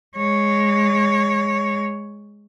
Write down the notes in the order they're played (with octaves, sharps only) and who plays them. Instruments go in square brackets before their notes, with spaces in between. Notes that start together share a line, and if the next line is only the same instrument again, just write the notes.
[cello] G#3 C#5